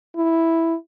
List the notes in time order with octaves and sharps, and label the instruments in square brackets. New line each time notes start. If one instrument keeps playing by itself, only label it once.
[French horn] E4